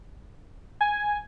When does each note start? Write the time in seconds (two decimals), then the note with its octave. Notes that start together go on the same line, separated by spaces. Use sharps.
0.81 G#5